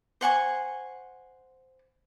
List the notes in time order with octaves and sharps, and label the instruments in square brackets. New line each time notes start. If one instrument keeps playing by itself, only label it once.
[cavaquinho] C5 F#5 G#5 C#6